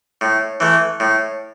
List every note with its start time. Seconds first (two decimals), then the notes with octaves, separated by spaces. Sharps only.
0.21 A2
0.60 E3 A3
1.00 A2